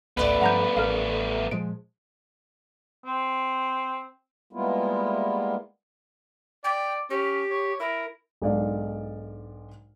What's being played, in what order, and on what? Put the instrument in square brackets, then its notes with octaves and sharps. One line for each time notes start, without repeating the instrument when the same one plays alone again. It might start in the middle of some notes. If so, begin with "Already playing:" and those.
[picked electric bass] G#1 C#2 [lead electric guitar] A3 B3 [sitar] B4 D5
[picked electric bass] G2 F3 [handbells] F#5 A#5 G6
[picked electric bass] A1 [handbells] A#4 F5
[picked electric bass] A#2 F3 G#3 [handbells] D7
[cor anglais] C4
[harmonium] G3 G#3 A#3 B3 E4 F4
[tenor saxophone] D5 [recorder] G5
[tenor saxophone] C#4 [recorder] G4
[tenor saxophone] C#5
[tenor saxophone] E4 [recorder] A#4
[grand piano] B1 G#2 D4 A#4 D5 F5